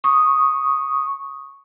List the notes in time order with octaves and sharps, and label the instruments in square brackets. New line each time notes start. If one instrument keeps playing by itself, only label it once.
[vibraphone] C#6 D#6